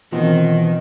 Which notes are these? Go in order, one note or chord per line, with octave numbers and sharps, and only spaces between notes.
B2 D#3 E3 C4 F4